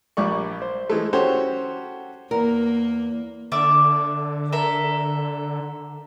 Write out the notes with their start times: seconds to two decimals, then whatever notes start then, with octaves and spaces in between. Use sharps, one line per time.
0.17 A#1 G3 D5 C#6
0.62 C5
0.90 E3 G#3 A3
1.13 C#4 F#4 G4 A4 C5 C#5
2.31 E2 A#3 A#4
3.52 D3 D5 E5 D6
4.52 A4 A#4 E5